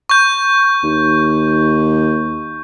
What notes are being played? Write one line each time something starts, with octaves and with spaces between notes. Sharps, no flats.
C#6 G6
D#2